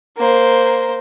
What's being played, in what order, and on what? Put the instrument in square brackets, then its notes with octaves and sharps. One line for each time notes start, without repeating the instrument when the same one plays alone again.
[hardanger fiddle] A#3 C5